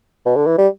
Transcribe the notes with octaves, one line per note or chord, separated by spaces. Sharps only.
B2
D3
E3
G3